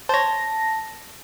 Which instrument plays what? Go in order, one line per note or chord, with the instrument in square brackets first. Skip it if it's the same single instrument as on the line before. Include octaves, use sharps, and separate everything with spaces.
[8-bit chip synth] C5 C#5 [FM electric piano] A5 A#6